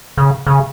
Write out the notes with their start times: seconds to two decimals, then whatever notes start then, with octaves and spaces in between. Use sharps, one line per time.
0.17 C#3
0.47 C#3